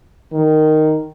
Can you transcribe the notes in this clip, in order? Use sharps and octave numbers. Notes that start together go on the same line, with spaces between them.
D#3